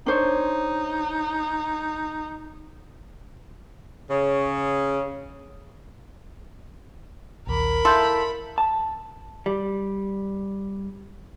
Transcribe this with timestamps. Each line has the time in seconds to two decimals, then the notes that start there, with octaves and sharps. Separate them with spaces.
0.06 D4 D#4 C5 C#5
4.10 C#3
7.47 A#1 D#2 A#4 B5
7.85 E4 A4 E5 F5 C6 G6
8.58 A5
9.46 G3